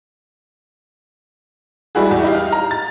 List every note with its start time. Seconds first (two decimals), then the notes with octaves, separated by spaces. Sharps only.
1.95 G3 G#3 E4 F#4 G#4
2.11 E2
2.23 D#4 E4 G4 D#5 F5
2.35 F6
2.52 A#5
2.71 A6